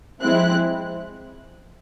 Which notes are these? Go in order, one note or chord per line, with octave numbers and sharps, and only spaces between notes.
F3 G#3 C4 E4 F#6